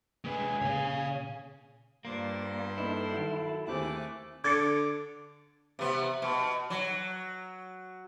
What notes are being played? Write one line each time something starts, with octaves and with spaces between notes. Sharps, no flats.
G#3 G#4 B4 G#5
A#2 C#3 C#5 F5
G2 A#3 F4 C5 D5 C6
A#3 D#4 E4 A4 B4
D#3 F#3
D#2 A3 C4 G#4 C5 D6 F#6
D3 D6 G#6 A6 C#7
C3 B3
B2
F#3